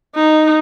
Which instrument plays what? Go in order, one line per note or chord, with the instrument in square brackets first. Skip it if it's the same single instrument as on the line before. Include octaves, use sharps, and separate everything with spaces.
[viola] D#4